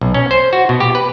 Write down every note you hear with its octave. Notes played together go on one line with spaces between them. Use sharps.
B1
C#4
C5
F#4
B2
G4
B4